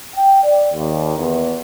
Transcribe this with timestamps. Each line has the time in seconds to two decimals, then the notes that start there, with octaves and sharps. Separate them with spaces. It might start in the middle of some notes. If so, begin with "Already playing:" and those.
0.15 G5
0.44 D5
0.74 D#2
1.17 E2